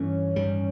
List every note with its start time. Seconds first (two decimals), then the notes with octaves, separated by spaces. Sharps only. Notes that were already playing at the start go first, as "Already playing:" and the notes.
Already playing: G2 E3 A3 C#4
0.36 A1 G2 D#3 G3